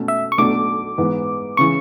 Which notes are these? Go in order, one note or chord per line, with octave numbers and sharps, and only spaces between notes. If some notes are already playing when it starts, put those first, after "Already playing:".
Already playing: B2 A3 C#4
E5
C#6
B1 B2 A3 D4 D6
G#2 E3 B3
C#3 E3 C#6